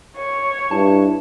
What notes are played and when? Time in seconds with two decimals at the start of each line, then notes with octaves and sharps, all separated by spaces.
0.16 C#5
0.71 G2 E4 A5